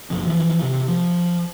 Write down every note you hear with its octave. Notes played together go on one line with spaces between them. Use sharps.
F#1 B1 F2
E3 F3
C3
F3